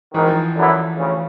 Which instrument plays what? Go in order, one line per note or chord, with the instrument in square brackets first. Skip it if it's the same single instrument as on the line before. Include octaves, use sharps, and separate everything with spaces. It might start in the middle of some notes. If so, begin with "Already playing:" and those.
[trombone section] G#1 G#2 D#3 [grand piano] E3
[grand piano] F3
[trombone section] F#2 D3 F#3 B3 E4
D2 C#3